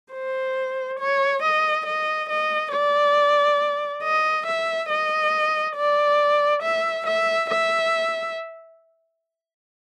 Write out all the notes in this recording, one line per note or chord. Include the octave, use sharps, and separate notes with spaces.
C5
C#5
D#5
D#5
D#5
D5
D#5
E5
D#5
D5
E5
E5
E5